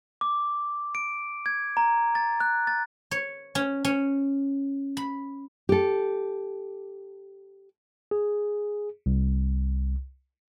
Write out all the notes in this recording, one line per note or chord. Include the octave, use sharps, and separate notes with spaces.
D6
D7
G#6
A#5
A6
F#6
A6
C#5
C#4
C#4
B5
G4 A4
G#4
C2